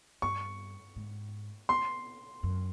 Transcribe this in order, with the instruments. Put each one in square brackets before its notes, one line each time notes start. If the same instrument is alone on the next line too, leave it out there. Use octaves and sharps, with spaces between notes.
[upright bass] G2 [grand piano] C#6
[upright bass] G#2
[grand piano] C6
[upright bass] F#2